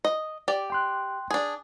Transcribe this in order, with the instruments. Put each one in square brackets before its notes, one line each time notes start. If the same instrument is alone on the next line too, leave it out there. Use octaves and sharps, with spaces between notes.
[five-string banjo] D#5
G4 D5
[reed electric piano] G5 C6 F#6
[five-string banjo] D4 G#4